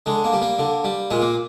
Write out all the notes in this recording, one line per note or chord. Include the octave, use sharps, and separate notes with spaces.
D3 G#3
A#3
G3
A#3
D3
G3
A#2 G#3
A#3